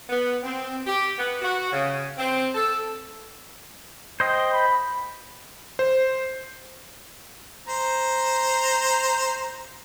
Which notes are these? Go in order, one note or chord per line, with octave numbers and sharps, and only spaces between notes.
B3
C4
G4
B3
F#4
C#3
C4
A4
C5 D#5 G5
B5
C5
C5 A#5